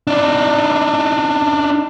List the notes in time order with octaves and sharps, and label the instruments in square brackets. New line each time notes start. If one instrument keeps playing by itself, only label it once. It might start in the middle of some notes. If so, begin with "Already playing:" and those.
[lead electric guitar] D4 D#4